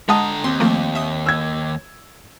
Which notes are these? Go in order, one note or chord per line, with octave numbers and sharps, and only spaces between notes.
D3 G#3 D#5 F#5 A5 A#5 D#6
D#2 C4 C6
F3 A3 A#3
E5 D#6
E6 G#6